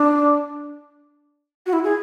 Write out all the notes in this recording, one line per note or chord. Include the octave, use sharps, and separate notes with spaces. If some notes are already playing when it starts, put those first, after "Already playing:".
Already playing: D4
F#4
E4
G#4